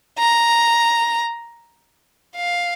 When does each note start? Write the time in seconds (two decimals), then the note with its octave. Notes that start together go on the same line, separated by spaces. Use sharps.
0.19 A#5
2.36 F5